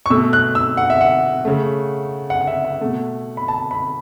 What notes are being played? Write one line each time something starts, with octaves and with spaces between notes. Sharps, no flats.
C#6
B2 A3 E6
F#6
E6
F#5
E5
F#5
C#3 A3
F#5
F#5
E5
F#5
B2 A3
B5
A5
B5